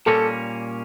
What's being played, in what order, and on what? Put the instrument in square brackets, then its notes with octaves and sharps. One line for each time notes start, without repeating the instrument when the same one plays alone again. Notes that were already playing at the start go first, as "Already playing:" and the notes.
[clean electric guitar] A#2 G3 A#3 C#4 [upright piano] A4